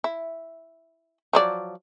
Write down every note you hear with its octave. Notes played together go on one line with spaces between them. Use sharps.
E4
F3 F#3 D5